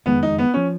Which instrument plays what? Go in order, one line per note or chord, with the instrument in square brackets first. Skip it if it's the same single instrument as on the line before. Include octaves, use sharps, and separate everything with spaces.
[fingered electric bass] F#1 F2 D#3 G#3 [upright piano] B3
[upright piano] D#4
B3
[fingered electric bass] F3 [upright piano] C#4